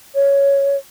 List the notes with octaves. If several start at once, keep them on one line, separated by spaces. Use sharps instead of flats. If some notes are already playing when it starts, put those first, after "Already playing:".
C#5